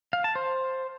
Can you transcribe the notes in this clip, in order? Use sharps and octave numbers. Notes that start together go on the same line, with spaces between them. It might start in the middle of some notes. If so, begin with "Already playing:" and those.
F5
A5
C5